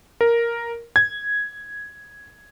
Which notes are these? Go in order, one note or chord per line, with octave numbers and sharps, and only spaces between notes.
A#4
G#6